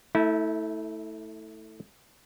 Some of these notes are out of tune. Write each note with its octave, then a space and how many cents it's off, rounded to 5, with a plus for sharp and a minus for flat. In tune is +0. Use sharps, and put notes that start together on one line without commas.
A3 +5 E4 -30